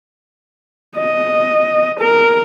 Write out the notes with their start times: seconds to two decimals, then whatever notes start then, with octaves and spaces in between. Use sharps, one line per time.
0.97 D#5
2.00 A#4